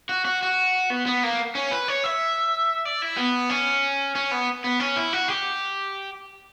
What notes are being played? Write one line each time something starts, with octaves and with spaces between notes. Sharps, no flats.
F#4
F#4
F#4
B3
B3
A#3
C#4
B4
C#5
E5
D5
E4
B3
C#4
C#4
B3
B3
C#4
E4
F#4
G4